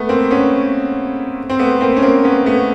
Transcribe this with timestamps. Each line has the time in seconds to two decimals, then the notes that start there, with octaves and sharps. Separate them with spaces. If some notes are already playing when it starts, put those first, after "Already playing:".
Already playing: A3 B3
0.09 A#3 C4
0.30 B3 C#4
1.50 C4
1.59 A3 B3
1.81 A#3 C4
1.97 C#4
2.02 A#3 C4
2.24 B3 C#4
2.46 A3 B3